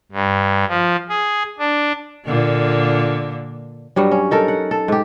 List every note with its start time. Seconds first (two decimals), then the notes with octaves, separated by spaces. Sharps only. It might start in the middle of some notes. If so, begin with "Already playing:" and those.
0.12 G2
0.69 F3
1.09 G#4
1.59 D4
2.26 A#2 D3 A#3
3.96 G2 F#3 G3
4.11 C#4
4.31 D#4 A4 A#4
4.48 F#5
4.71 A4
4.88 G#2 G4